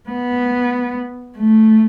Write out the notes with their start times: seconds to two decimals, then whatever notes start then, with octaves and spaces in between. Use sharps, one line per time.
0.09 B3
1.38 A3